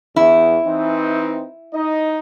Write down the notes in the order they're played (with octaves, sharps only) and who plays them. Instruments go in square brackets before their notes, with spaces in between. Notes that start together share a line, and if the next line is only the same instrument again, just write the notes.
[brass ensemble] E2 [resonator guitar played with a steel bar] E4
[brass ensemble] E3 C4 D#4
D#4 D#5